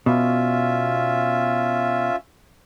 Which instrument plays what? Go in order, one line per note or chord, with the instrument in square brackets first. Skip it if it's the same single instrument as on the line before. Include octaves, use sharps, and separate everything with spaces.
[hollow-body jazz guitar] B2 [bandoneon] C#4 F4 E5